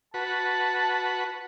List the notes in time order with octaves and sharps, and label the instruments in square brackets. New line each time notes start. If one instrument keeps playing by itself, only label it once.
[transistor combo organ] F#4 B4 [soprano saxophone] A5